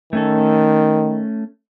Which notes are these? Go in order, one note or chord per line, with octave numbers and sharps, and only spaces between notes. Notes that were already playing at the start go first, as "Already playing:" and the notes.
D#3 A3 C#4 A4